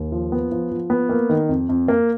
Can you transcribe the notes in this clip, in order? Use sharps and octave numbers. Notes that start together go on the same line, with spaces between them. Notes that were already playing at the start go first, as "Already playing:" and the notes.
Already playing: D#2
F3
B3
F3
F3
B3
A#3
D#3
F2
F2
A#3